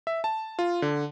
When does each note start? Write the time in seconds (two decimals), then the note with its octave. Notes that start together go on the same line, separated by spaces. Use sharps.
0.07 E5
0.24 A5
0.59 F4
0.82 D3